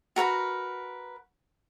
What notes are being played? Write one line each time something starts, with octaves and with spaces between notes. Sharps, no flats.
F#4 A#4 B4 B5